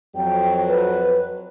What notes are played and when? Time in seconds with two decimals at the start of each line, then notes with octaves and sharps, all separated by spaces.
0.16 F2 F#3 G5
0.68 B4